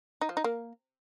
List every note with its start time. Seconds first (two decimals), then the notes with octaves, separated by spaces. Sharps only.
0.21 D#4
0.29 F3
0.37 D#4
0.44 A#3